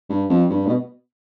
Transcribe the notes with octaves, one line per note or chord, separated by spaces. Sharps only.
G2
F2
G2
B2